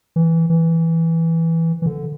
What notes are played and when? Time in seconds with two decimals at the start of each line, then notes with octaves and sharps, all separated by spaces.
0.16 E3
0.50 E3
1.82 E3
1.86 D3